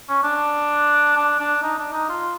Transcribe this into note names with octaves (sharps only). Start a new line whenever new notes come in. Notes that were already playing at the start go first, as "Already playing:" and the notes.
C#4
D4
D4
D4
D#4
D4
D#4
F4